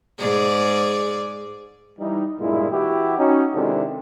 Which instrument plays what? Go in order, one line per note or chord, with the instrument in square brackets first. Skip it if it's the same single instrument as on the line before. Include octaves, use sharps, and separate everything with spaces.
[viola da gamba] G#2 G#4 D5
[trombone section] E3 G3 D#4
B1 G2 A#2 G#3 E4
E3 E4 F#4 G4
C#4 D#4 F#4
C3 D#3 G#3 D4 E4 A4